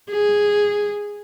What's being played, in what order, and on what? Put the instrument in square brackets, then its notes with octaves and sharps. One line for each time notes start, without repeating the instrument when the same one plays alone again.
[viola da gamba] G#4